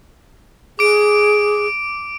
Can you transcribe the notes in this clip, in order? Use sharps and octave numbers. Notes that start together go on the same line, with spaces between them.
G#4 D6 D7